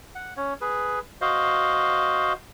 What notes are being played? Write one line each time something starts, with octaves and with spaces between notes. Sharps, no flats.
F#5
C#4 C#5
G#4 B4
F#4 C5 D#5 F5